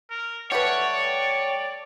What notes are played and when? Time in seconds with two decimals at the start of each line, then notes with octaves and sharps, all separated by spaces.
0.11 A#4
0.52 G3 A3 B4 C#5 D5 F#5
1.01 G5